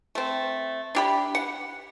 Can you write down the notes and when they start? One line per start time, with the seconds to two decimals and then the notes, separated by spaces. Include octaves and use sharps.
0.15 A3 C4
0.95 D4 G4 B5
1.35 F#5